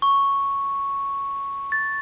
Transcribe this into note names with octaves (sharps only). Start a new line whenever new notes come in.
C#6
A6